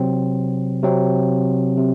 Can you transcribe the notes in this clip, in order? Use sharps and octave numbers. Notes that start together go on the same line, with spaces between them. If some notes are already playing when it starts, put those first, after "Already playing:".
Already playing: C3 F#3 C4
C3 F#3 C4
C3